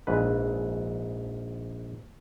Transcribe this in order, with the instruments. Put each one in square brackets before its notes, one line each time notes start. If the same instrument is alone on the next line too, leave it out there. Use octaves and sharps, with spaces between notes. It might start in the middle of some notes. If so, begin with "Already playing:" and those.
[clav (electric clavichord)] A#1 G#2 B4